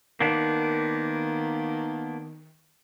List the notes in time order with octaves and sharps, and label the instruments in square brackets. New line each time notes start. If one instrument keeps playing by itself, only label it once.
[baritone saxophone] D#3 [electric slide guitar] A#3 B3 D4